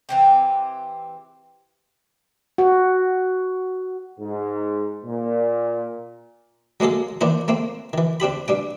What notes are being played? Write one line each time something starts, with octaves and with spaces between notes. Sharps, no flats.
E3 C4 G4
F#4
G#2
A#2
F#3 G#3 A#3 G#4 A4
D#3 E3 A#3 D4 C5
A3 A#3 C4
D#3 E3
C4 D4 G4 B5
G2 G3 G5